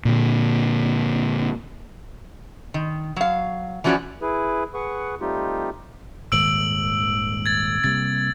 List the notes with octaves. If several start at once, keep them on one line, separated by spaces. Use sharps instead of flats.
A#2 D3
D#3
F#3 F5
E3 F3 C#4 F#4 C#5 D5
E4 G#4 B4
G#4 B4 F#5 C#6
G3 A3 C4 D#4 F4 G4
D#1 G#2 D#3 E6 D7 F#7
G#6 A6
C3 G3 A#3 A6